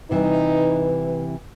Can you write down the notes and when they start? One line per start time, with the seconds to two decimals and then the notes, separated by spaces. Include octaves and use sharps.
0.11 C3 E3 G3 D#4 B4